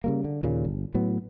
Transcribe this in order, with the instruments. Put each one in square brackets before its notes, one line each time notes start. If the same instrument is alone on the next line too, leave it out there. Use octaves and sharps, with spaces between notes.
[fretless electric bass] C#3 G3 A#3
D3
D#2 A#2 C#3
G1
A2 F#3 B3